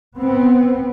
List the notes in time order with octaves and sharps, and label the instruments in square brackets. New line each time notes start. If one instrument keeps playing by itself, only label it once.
[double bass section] B3 C4